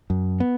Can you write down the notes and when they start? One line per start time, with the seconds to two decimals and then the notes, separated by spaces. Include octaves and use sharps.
0.10 F#2
0.40 B3